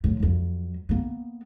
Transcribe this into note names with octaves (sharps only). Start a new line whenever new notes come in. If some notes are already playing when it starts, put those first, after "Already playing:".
A2 F3
F2 F#3
A#3 B3